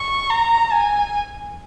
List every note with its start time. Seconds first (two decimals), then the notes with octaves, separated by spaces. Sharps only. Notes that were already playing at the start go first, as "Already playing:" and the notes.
Already playing: C#6
0.30 A#5
0.72 G#5